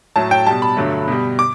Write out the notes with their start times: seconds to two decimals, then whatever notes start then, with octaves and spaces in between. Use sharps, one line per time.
0.16 A2 F#3 A3 A5
0.31 G5
0.47 B2 G3 A5
0.62 B5
0.77 G2 D3 F#3 A3
1.08 B2 G3
1.39 D6